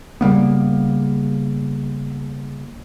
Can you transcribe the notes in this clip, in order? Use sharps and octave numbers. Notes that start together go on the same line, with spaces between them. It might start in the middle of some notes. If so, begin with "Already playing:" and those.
C#3 G3 A#3 B3